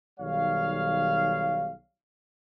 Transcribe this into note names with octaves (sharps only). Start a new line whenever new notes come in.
B1 D#3 G3 C#5 F5